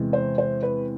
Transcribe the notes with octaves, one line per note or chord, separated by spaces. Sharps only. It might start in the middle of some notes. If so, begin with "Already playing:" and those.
Already playing: E2 C3 G#3
C5
C5
B4